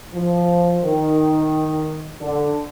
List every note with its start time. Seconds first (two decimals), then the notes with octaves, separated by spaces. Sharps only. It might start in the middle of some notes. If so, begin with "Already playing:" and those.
0.13 F3
0.82 D#3
2.21 D3